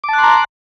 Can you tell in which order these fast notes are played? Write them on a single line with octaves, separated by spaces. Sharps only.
D6 A5 F#6 C6 A#5